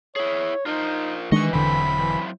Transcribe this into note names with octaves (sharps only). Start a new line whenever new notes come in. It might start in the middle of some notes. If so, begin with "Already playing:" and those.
E4 G#4 C#5
D#4 F4 A#4 C5
D#3 E3 G#3 D4 B4 D#5 C#6
E1 D3 F#3 C4 E4 B5
E3